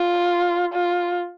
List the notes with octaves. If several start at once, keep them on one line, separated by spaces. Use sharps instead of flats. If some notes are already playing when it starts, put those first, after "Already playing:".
Already playing: F4
F4